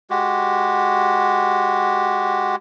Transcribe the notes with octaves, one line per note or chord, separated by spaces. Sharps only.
G#3 F#4 G4